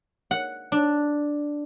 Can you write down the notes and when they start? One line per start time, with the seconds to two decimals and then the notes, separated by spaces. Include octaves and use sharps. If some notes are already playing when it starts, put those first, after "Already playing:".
0.31 F#5
0.72 D4